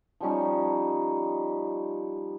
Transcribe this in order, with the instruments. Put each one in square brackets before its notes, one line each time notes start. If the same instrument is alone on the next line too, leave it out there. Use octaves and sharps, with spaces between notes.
[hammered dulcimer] F3 G3 C#4 D#4